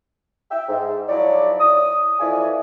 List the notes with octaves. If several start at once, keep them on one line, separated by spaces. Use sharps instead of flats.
E5 G5
G#2
F3 F#3 E4 C#5 D5
D#6
F2 E3 E4 F4 D5 G#5